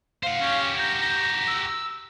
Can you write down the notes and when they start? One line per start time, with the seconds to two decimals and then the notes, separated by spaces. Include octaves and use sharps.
0.23 C5 F5 F#5
0.41 C#4 F#4 G4
0.79 A#5 G6
1.00 A#5
1.47 E6